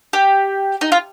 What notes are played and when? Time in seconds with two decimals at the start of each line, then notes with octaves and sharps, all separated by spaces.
0.13 G4
0.81 D#4
0.92 F4